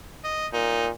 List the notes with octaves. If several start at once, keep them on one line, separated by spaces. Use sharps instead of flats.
D#5
A#2 D#4